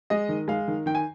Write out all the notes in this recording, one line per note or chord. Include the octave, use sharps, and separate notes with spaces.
G#3 D#5
D#3
G#3 F5
D#3
D#3 G5
G#5